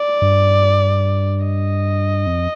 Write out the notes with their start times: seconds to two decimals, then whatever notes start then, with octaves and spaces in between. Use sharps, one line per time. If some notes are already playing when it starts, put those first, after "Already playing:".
Already playing: D5
0.22 G2
1.45 D#5
2.26 F2